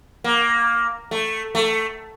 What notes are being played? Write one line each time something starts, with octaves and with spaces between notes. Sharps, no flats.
A#3
A3
A3